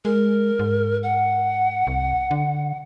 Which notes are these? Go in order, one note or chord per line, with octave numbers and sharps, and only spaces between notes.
G#3 A#4
G#2
F#5
C2
D3